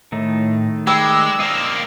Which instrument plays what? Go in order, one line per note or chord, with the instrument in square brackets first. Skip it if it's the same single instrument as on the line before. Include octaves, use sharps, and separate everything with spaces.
[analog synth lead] A2 [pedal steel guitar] D#3 A3 D#4
[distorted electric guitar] G#3 [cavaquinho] G4 B4 D5 [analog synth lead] E6
[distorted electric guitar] A#3 C4 [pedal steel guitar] D#5 F5